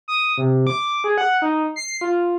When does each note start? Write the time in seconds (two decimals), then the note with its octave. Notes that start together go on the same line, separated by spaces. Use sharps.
0.08 D#6
0.38 C3
0.67 D6
1.04 G#4
1.18 F#5
1.42 D#4
1.76 C7
2.01 F4